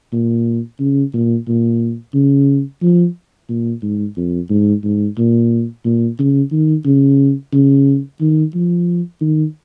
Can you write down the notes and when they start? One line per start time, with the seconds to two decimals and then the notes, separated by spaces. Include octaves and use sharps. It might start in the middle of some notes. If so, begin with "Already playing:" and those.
0.13 A#2
0.80 C#3
1.14 A#2
1.48 A#2
2.14 C#3
2.82 F3
3.49 A#2
3.82 G#2
4.17 F2
4.50 G#2
4.83 G#2
5.18 A#2
5.85 A#2
6.19 C#3
6.52 D#3
6.86 C#3
7.53 C#3
8.21 D#3
8.55 F3
9.21 D#3